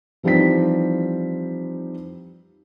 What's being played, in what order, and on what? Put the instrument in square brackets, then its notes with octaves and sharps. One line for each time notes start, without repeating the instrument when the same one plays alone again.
[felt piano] E3 F3 G3 C4 D#4 B6